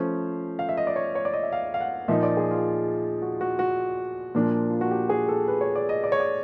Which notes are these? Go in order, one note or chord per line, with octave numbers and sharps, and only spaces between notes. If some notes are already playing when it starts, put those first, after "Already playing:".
Already playing: F3 A3 C#4 C5
F5
E5
D#5
D5
C#5
C#5
D5
D#5
E5
F5
F5
F#5
A#2 F3 A#3 D#4 E5
D5
G#4
F4
F#4
F#4
F#4
A#2 F3 A#3 D4
F4
F#4
G4
G#4
A4
B4
C#5
D5
D#5
D5
C#5
D5